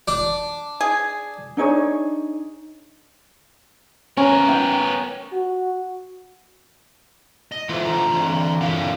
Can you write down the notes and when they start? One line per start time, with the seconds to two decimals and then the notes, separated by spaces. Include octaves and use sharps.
0.08 D4
0.81 G#4
1.57 D4 D#4 G#4 C#5
4.17 B3 C#4 A#4
4.48 G5
5.33 F#4
7.52 D#5
7.69 E3 A3 F4 C5
7.85 D3 A#5
8.13 E3 C4
8.61 F2 D3 E4 A#4 F5